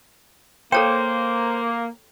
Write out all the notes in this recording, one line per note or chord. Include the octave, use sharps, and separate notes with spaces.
A#3 A4 C5 C#5 G5